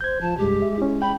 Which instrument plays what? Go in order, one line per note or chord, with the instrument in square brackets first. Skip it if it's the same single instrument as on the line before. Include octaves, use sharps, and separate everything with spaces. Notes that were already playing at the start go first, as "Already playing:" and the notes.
[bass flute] C5 [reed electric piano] G6 G#6
[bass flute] F3 [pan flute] A5
[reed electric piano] C2 G2 [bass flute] G#3 [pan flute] G4
[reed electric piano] E5
C#4 E4
[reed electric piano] G5 [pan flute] B5